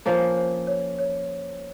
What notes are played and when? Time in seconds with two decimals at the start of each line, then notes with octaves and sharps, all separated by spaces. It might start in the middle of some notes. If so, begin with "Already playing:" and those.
0.05 F3 A#3 C#4 C5
0.37 C5
0.67 C#5
0.99 C#5